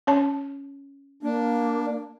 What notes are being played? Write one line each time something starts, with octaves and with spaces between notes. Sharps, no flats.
C#4 C#5 A5
A#3 D4